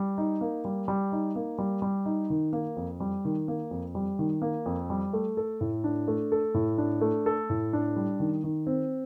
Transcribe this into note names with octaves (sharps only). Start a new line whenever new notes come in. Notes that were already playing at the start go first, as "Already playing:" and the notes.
Already playing: G3
D#4
A#3
G3
G3
D#4
A#3
G3
G3
D#4
D#3
A#3
F2
G3
D#3
A#3
F2
G3
D#3
A#3
F2
G3
A3
A4
A2
D4
A3
A4
A2
D4
A3
A4
A2
D4
G3
D#3
D#3
C4